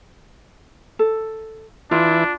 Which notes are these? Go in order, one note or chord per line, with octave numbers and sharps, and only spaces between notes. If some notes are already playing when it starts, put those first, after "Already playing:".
A4
E3 D4 F4